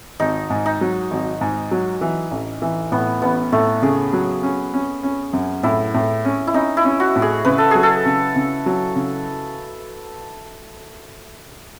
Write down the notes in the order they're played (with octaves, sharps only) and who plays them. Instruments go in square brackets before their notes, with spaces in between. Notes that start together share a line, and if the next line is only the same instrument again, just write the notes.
[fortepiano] G#1 [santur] D#4
[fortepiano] G#2
[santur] D#4
[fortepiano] F#3
G#1
G#2
F#3
E3
A1
E3
[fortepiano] A2 [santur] B3
[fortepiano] A1 [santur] B3
[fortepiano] A2 [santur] A3
[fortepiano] C#3 [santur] G#4
[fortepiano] F#3
C#4
C#4
C#4
F#2
[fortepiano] A2 [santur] E4
[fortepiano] A2
C#4
[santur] E4
[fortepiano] C#4 [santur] D#4
[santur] E4
[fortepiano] C#4
[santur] F#4
[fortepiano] A2
[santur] G#4
[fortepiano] C#3 [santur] B4
[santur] A4
[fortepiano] F#3 [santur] G#4
[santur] A4
[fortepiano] C#3
C#3
F#3
C#3